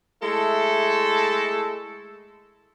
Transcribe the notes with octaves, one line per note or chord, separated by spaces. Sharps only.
G#3 A3 E4 A4